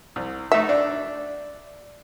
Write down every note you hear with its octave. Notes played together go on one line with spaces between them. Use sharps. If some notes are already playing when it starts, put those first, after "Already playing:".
C2
A3 D#4 F#4 E5
D4